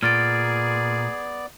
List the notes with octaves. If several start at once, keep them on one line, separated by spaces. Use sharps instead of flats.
A#2 B3 G#4 D5 F6 A6 D7